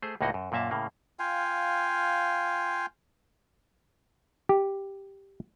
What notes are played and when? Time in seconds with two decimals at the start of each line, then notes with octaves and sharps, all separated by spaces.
0.02 A3 G#4 C5
0.21 C#2 A2 A#3 D#4 F#4 D#5
0.34 F#2
0.52 F#2 A#2 A#3 E5 A5
0.71 A2 C#3 A#3
1.19 F4 F5 G5 G#5
4.49 G4